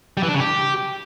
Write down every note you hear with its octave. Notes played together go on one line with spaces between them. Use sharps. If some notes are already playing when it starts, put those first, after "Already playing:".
G3
E3
D4
C#3
G4